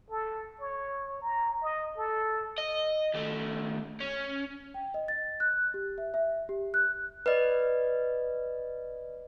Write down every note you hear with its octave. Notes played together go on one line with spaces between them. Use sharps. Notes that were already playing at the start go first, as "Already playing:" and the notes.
A4
C#5
A#5
D#5
A4
D#5
D#2 A3
C#4
G5
D#5
A6
F#6
G4
E5
E5
G4
F#6
B4 D5 D#5